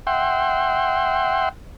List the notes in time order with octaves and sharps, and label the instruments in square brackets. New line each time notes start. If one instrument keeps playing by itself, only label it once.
[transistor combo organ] E5 F#5 G5 C6